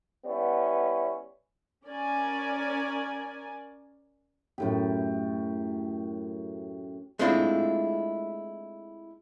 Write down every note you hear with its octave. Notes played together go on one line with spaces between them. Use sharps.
G3 B3 C#4 E4
C#4 A#4 D5 G#5
F#2 A2 G4
G#3 A3 C4 D4 E4 F4